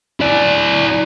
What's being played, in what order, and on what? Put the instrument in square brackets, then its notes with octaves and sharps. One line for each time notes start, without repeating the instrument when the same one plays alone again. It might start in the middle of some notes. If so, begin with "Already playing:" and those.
[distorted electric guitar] E4 D5